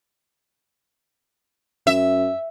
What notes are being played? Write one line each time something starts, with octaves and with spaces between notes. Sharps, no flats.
F#2 E5